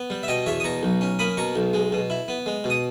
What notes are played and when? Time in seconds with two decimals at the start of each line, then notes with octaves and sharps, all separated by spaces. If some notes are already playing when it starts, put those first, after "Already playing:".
Already playing: B3
0.10 G3
0.23 E5
0.28 B2 D#5 G5
0.46 E2 C#5 E5
0.60 D#6
0.64 B2 A#5 C#6
0.83 B1
1.01 C#4
1.19 A#3 B5 D#6
1.37 B2 A#5 C#6
1.56 B1
1.73 G#3
1.92 B2
2.10 E4
2.28 B3
2.46 G#3
2.64 B2
2.70 D#6